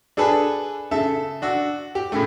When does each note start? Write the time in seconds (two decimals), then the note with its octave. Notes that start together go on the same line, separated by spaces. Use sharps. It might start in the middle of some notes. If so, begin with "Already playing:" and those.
0.17 D4 G#4 A4 B4 G#5 A5
0.91 C#3 A4 E5
1.42 D4 F#4 E6
1.95 G4
2.12 A2 C#3 A3